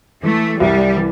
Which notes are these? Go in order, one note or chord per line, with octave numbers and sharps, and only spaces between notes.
E3 A3
C2 G3
E3